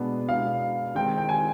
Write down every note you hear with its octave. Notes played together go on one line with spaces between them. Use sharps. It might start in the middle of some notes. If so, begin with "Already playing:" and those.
Already playing: B2 G#3 B3 D4
B2 G#3 B3 D4 F5
D#3 G#3 C4 D#4 G5
G5
G#5